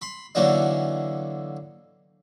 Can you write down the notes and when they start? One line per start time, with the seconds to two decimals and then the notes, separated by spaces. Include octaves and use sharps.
0.02 B5 C6
0.35 D3 E3 F#3 A#3 D4 D#4